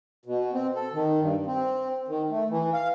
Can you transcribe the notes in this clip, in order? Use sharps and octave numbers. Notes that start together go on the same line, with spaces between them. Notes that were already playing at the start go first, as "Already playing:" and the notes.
B2
C4
A4
D#3
G2
C4
D#3
A3
E3
F5